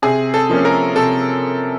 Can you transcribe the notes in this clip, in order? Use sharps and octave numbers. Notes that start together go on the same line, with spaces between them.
C3 G#4
A4
F3 A#3 C#4
A#4
C3 A4